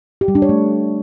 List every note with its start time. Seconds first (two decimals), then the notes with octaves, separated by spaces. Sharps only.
0.21 G4
0.28 G3
0.35 D4
0.42 C#5
0.49 A3